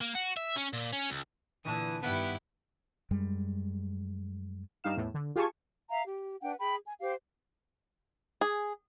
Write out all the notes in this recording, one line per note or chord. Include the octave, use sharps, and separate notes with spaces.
A#3
F#4
E5
C#4
A#2
C#4
C#2
A#2 D3 E3 A5 D#6
G2 D#3 B3 E4 G4 F#5
F#2 G3 G#3
G2 D#4 F5 E7
E2 A2
D3
F4 G4 G#4 G#5 A5 C#6
E5 F5 A#5
G4
D4 B4 F#5 G5
G#4 G5 B5
G#5
G4 C5 F5
G#4